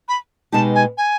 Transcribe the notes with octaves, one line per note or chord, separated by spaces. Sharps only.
B5
B2 G#3 B3 D#4 G4 A5
G#5
G#5